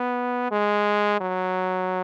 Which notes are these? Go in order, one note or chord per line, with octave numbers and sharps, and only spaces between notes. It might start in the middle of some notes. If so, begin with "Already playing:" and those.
Already playing: B3
G#3
F#3